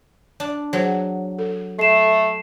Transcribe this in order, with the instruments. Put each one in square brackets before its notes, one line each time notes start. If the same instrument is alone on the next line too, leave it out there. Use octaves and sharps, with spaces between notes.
[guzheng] D4
[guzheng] F#3 [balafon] G#4 C5 F#5
[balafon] A4
[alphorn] A3 [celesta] C7 E7